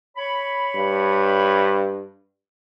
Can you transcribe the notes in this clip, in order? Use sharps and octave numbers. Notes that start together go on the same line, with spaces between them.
C#5 B5
G2